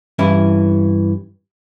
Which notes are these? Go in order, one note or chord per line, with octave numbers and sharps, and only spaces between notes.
G2 E3 C#4 E4